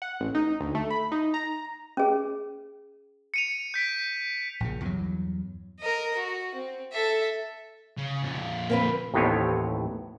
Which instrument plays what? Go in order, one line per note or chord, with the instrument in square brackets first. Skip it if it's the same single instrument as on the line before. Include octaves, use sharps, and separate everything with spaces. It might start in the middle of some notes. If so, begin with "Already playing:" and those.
[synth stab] F#5
A1
D#4
D2
A3
B5
D#4
A#5
[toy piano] C#4 G#4
[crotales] C#7 D#7 F7
G6 B6 D7
[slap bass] A#1 A#2 C#3
E2 G2 F#3
[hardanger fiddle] A#4 D#5
F#4
C4
A4 E5
[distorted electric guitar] C#3
F2 A#2
[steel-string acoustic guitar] A#3 C4 B4
[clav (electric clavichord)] A1 D#2 A2 B3 C4 C#5